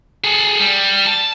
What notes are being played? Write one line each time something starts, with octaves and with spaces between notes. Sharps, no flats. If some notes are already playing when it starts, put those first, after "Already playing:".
G#4 A4
G3
A5